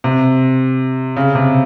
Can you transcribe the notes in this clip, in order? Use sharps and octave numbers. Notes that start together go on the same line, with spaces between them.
C3
C#3
C3